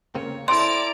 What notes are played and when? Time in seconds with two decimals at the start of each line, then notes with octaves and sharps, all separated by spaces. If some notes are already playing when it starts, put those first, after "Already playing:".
0.15 C#3 A#3 C4 C#5
0.48 C4 E4 A4 D5 A#5 C6 D7